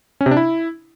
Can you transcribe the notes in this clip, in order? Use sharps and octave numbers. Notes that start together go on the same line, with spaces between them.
C#4
C3
D4
E4